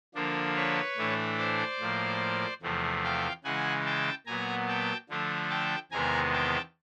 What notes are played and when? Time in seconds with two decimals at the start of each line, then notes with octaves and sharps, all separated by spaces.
0.14 D3 F3 A#3 D4
0.56 B4 C#5
0.97 A2 E3 A3 D4
1.38 C5 D5
1.80 A2 F3 A#3
2.62 E2 C3 F3 A3
3.04 F5 G5
3.44 C#3 E3 G#3 F#5 G#5
3.85 G5 A5
4.26 A#2 F#3 B3 G#5 A#5
4.68 G5 A5
5.09 D3 F3 A3 D4
5.50 G5 A5
5.91 E2 C3 D#3 G#3 B3 G#5 A#5
6.32 G5 A5